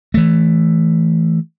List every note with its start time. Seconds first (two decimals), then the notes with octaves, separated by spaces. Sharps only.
0.14 E3 A3